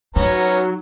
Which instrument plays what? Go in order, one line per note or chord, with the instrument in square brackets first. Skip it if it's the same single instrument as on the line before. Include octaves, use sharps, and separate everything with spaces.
[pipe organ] F#3 [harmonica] B3 C#4 A#5 [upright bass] D#4 [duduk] C#5